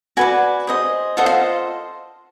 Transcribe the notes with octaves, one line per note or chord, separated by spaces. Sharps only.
F#4 B4 D5 G#5
G#4 C5 D#5
F4 A4 C5 D#5 F#5
F5